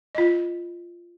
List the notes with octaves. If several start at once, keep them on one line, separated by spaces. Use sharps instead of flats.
F4 D#5